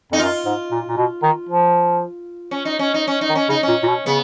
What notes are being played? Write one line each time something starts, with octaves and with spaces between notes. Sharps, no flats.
F2 D#4
F#2 F4
G#2
A#2
A#2
B2
D#3
F3
C#4
D#4
C#4
D#4
C#4
D#4
D#3
C#4
C#3 D#4
C#4
A#2
A#2
B2
C#3 B3